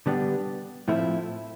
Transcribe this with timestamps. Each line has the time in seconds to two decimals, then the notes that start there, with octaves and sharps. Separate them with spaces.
0.06 D3 G3 B3 D4 G4
0.88 A2 F3 A3 C4 E4